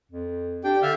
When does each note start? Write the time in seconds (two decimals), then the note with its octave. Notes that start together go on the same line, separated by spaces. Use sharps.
0.12 F2
0.64 D4 G4 G5
0.82 D3 E5 F5